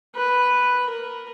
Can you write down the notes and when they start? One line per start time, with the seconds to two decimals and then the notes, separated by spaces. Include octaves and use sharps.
0.15 B4
0.90 A#4